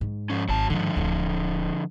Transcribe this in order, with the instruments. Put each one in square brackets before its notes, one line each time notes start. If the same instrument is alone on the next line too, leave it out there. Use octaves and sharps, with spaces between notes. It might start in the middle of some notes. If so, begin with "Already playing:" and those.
[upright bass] G#2
[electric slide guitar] F3 C#4
[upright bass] G#1 [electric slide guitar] F#3 A5
[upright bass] G#2 D#3 [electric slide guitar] D3 F3
[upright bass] D1 A3